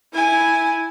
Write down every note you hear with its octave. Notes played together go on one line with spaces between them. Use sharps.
E4 G#5